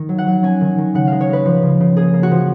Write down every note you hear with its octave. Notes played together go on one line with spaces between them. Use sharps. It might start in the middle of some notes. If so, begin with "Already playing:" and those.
Already playing: D#3
F#3
F#5
F#3
C#4 G#5
D#3
D#3
C#3 F#5
G#3 F5
C#5
G#3 B4
F3
C#3
C#3
A#3 G#4
A#3
F#4
F3